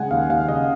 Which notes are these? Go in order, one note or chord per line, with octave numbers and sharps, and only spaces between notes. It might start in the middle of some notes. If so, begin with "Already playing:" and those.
Already playing: C#3 G#3 F#5 G#5
D#2 F5
D#2 F5
C#3 D#5